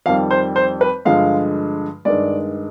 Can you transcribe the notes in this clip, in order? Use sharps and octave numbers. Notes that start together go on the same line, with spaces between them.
F2 D#3 G3 F5
C5
C5
B4
G2 D3 F3 G#3 F5
G2 D#3 G#3 D5